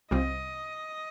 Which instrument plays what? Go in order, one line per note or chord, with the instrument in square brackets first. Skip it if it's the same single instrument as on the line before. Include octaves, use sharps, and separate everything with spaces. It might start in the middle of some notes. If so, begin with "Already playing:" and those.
[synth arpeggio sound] C2 C3 G3 C4 F4 [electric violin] D#5